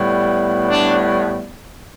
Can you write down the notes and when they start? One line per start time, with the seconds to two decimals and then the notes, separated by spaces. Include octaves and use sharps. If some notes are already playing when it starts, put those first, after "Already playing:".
Already playing: A2 G3 B3
0.69 D4